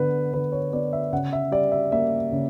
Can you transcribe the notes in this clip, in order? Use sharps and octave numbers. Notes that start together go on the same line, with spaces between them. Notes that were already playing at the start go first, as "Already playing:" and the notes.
Already playing: D3 B3 B4
D3 B4
C#5
B3 D5
E5
C#3 F#5
E5
G3 D5
E5
A#3 E5
C#3